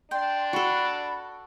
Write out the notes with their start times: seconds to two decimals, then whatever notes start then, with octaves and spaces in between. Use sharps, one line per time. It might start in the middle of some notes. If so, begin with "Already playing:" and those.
0.11 D4 G5 C6
0.53 F#4 A4 B5